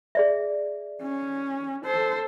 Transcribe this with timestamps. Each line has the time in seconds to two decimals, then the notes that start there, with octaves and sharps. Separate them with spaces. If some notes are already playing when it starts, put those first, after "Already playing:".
0.15 G#4 D5 E5
1.02 C#4
1.85 A4 C5